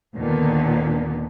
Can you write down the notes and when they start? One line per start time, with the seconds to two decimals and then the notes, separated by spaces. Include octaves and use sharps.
0.14 D#2 A#2 D3 B3